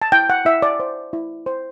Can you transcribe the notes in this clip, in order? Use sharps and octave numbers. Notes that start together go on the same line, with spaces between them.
A5
E4 G5
F#5
E4 E5
D5
C5
E4
C5